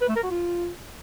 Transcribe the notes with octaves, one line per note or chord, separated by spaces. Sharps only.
B4
A3
A#4
F#4
F4